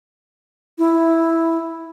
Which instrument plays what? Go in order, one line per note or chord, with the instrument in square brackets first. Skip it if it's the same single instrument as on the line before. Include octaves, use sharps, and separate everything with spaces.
[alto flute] E4